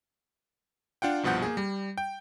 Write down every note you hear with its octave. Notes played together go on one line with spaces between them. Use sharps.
D4 F4 F#5 G5
C2 G2 B2 F3 F#5 G6
A#3 G#4
G3
G5